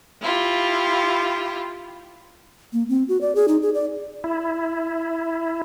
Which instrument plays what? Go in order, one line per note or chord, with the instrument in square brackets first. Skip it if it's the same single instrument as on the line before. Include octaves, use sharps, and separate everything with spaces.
[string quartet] E4 F4 G4
[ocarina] A#3
C4
F#4
D5
G#4
D#4
G#4
D5
[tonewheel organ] E4